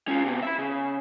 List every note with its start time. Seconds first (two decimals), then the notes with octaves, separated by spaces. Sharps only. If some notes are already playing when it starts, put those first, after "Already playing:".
0.08 C#4 F4
0.24 C3 B3
0.43 E5 B5
0.58 C#3